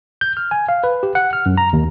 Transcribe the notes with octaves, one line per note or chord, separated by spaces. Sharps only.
G6
F6
G#5
F5
B4
G4
F#5
F6
F#2
A#5
D#2